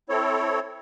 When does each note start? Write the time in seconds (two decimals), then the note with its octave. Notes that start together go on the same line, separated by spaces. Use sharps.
0.09 C4 E4 A4 C#5